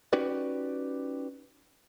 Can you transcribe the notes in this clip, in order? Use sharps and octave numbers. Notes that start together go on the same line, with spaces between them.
C#4 D#4 F#4 G4 B4 D5